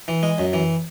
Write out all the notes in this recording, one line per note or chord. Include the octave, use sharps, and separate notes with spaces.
E3
G#3
F#2
E3